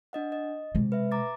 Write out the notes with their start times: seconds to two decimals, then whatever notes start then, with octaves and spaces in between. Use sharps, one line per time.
0.13 D4 D#5 F#5
0.32 D#5
0.75 C3 G#3
0.92 B4 E5
1.11 A#5 D6 A6